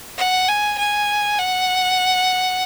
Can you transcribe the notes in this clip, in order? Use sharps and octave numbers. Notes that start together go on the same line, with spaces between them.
F#5
G#5
G#5
F#5